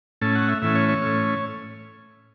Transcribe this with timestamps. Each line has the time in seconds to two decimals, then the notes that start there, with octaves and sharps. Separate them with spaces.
0.21 A2 A3 C#4 A5
0.35 F#5
0.48 E5
0.62 A2 E3 A3 C#4 E5
0.75 C#5
0.89 C#5
1.02 A2 A3 C#4